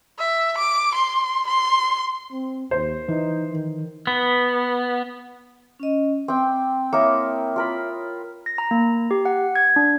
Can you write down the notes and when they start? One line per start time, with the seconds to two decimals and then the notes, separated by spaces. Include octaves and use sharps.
0.18 E5
0.58 D6
0.95 C6
1.47 C6
2.32 C4
2.71 D#2 C5
3.09 E3 D#4
3.52 D#3
4.07 B3
5.80 C#4 D#5
6.28 C4 G5 D6
6.93 A#3 E4 A#4 C#5 E5 D#6
7.56 F4 A#4 B5
8.46 A#6
8.58 A#5
8.71 A#3
9.11 G4
9.25 F#5
9.56 G#6
9.76 D4